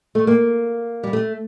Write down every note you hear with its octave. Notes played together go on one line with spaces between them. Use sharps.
A3
A#3
G3
A3